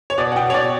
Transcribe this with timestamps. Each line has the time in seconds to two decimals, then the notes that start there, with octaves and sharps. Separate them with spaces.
0.10 C#5
0.18 B2 D5
0.32 F#5
0.36 B2 G5
0.50 C#5
0.54 B2 D5